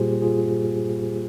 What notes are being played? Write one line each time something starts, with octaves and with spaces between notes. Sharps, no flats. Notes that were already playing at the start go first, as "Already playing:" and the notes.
Already playing: A#2 G3 A#3 F4 G4 G#4 C5
F4 G#4